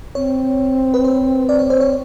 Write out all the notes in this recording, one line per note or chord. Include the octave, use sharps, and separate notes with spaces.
C4 C#5
B4
C5
D5
C#5
C5
C#5